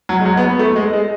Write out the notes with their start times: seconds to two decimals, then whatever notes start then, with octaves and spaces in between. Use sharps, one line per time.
0.09 F#3
0.21 G#3
0.26 F#3
0.37 B3
0.48 B3
0.59 A3
0.76 G#3
0.93 G#3